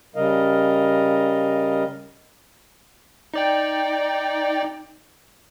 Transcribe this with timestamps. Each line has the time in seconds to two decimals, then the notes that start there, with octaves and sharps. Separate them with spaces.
0.16 C#3 G3 A#4 D#5 F5
3.34 D#4 D5 G5